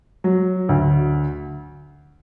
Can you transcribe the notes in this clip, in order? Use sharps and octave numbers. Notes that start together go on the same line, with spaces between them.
F#3
D2